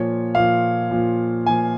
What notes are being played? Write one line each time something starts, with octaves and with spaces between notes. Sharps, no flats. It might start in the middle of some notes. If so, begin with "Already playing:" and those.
Already playing: A#2 F3 C#5
A#2 F3 F5
A#2 F3
A#2 F3 G#5